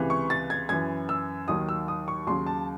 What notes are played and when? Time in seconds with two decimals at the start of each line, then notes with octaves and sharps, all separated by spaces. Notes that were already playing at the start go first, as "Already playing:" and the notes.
Already playing: C#2 C3 E3
0.10 C#6
0.30 A6
0.50 G#6
0.69 F#2 E3 G#6
1.09 E6
1.48 D#2 D#3 F#3 D#6
1.69 E6
1.88 D#6
2.08 C#6
2.27 D#2 C#3 F#3 C6
2.47 A5